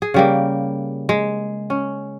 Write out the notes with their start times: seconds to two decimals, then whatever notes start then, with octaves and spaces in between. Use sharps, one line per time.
0.02 G#4
0.14 C#3 G3 A#3
1.09 G#3
1.70 C#4